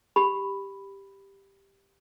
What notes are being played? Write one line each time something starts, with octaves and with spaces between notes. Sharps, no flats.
G4 B5